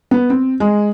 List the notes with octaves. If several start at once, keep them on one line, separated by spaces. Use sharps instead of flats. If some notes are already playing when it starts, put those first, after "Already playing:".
B3
C4
G#3